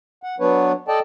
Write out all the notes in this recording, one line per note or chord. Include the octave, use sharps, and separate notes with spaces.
F#5
F#3 B3 D4 B4 C#5
A4 D5 D#5 G5 A5